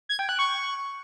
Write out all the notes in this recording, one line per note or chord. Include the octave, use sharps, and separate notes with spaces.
G#6
G5
F#6
C#6